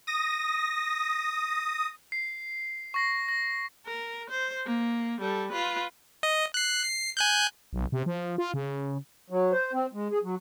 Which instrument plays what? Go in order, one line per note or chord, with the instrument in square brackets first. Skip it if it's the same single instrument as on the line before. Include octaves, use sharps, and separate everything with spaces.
[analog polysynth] D#6 A#6
[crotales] C7
C#6 A#6 C7
A#6
[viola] A#4
C5
A#3
G3 A4
F4 B4
[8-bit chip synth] D#5
F#6 C7
C7
G#5 F#6 G6
[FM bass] B1
C3
F3
F4
C#3
[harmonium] F#3
C5
C4
G#3
G#4
F#3